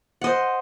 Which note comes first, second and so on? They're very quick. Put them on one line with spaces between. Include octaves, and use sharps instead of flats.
F#5 D#5 C5